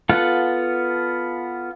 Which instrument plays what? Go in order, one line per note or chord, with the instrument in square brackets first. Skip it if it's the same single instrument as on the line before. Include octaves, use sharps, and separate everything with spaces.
[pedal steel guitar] B3 F4 A4 F#5